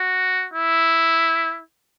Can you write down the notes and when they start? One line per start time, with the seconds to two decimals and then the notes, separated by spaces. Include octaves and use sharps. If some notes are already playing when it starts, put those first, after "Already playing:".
Already playing: F#4
0.54 E4